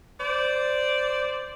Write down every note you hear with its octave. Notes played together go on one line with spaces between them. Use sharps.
C5 D5